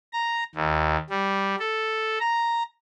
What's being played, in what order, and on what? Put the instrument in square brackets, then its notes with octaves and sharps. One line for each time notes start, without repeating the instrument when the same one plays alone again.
[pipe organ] A#5
D#2
G3
A4
A#5